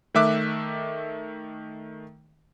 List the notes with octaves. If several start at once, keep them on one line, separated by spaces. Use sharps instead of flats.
D#3 A3 E5 D6 F#6